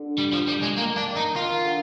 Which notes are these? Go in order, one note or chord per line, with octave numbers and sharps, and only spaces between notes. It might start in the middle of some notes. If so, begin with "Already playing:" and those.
Already playing: D3
G3
F3
G3
G#3
D#3 A#3
D4
D#3
D#4
D#3 F4
D3